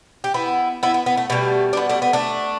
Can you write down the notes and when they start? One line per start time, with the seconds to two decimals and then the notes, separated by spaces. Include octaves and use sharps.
0.24 G4
0.34 B3 E4
0.83 B3 E4
0.94 B3
1.06 B3
1.17 A3
1.30 B2 G3 A3
1.73 D4
1.77 B3
1.89 A3 D4
2.02 B3
2.13 A3 D4